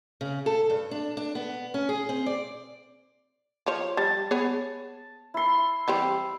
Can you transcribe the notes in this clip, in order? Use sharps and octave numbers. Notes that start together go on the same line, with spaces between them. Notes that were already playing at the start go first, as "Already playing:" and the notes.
C#3
A4
G2
D4
D4
B3
C#4
G#4
C4
D5
F3 C#5
G3 A5
B3 G#4 C#5
E4 C6
E3 G3 C4